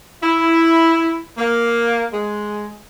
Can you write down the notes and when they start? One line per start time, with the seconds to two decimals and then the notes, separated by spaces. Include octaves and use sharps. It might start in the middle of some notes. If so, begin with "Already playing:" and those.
0.23 E4
1.38 A#3
2.13 G#3